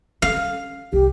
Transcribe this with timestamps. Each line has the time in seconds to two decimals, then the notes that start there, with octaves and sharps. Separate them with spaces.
0.22 C#4 F5
0.93 C2 G4